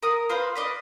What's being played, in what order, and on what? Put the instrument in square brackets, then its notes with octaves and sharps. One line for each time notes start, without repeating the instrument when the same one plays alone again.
[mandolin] A#4 D#6
F4 B4 C5
B4 D5 D#5